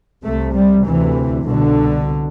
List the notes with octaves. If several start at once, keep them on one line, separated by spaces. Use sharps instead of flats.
C2 C3 A3
G3
D2 C3 E3
C2 B2 D3